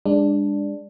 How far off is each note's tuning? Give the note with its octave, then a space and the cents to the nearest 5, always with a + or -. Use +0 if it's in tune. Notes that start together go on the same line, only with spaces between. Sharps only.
G#3 -35 D4 +0